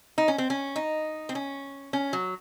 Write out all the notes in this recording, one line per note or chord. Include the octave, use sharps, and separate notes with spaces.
D#4
C#4
C4
C#4
D#4
C4
C#4
C#4
F#3